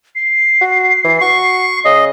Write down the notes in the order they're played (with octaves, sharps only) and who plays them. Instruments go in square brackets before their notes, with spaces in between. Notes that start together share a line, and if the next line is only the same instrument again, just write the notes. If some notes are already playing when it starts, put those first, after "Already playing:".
[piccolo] C7
[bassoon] F#4
E3
[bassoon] F#4 [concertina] C#6
[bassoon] C#3 [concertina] D#5